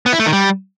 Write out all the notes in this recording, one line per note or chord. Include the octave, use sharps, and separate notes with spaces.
B3
E4
A3
D#3
G3